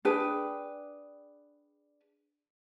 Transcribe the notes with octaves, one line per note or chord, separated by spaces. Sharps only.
D4 G#4 B4 G5